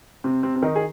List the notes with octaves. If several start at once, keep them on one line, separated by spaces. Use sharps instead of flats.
C3 C4
C3 C4
C4
D#3 D#4
G#4